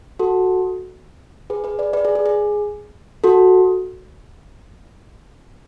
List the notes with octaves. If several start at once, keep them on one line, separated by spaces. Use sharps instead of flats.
F#4 A4
G#4 B4
G#4 B4
B4 D5
B4 D5
G#4
G#4
G#4
F#4 A4